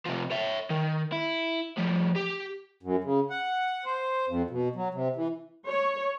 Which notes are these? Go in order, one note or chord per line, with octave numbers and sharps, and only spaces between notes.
C3 F3
C#5 E5
D#3
E4
A2 F3
G4
F#2
C#3
F#5
C5
F2
B2
F#3
C3
E3
C#5